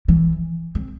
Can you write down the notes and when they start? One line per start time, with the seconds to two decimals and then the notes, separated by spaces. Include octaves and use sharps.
0.08 E3
0.75 C4